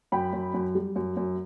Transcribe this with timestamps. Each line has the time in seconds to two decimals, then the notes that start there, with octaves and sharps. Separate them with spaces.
0.12 F#2 G5 B5
0.33 F#2
0.54 F#2
0.75 G3
0.96 F#2
1.17 F#2